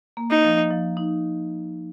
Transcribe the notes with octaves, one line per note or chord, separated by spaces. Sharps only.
A#3
D#4
F3
F3
D#4